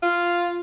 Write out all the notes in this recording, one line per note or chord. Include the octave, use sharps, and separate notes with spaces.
F4